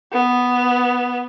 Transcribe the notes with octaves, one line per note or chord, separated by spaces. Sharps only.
B3